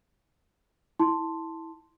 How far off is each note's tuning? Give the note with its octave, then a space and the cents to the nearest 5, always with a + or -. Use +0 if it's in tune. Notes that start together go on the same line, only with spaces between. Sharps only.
E4 -15 A5 +10 C6 +0